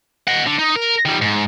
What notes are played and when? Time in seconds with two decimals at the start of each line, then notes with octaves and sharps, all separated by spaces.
0.27 D#5 F#5
0.46 D3
0.59 D#4
0.76 A#4
1.06 D#3 G3
1.22 G#2